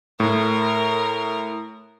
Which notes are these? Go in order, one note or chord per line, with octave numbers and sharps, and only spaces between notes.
A2 A#4